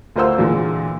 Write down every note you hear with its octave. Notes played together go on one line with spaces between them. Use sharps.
D2 F4 A#4 C5 F#5 E6
A#2 D3 E3 G#3 D4